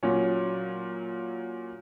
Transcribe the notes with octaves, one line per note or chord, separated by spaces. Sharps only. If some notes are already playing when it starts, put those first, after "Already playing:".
A#2 F#3 C#4